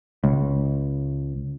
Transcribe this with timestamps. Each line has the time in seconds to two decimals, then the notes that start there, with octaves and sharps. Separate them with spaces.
0.24 C#2